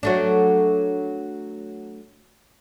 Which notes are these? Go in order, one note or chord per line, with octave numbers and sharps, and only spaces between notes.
F#3 A3 D4